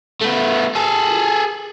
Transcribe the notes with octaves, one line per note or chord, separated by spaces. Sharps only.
A3 B3
G#4 A4